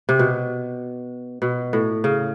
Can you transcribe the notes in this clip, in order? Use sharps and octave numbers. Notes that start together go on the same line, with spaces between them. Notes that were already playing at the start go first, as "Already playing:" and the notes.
C3
B2
B2
A2
C#3